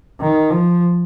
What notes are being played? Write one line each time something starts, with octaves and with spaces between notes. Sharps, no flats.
D#3
F3